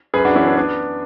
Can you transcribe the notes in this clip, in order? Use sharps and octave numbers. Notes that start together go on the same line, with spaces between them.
F#2 G#4 B4
D4 F#4
E3 C#4 E4
B3 D4
B3 D4